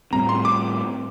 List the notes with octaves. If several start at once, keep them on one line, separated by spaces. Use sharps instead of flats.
A2 G3 C4 A#5
C6
D6